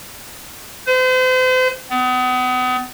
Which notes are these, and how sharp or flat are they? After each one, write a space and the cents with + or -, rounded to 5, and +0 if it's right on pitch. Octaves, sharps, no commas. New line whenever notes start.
C5 -40
B3 +35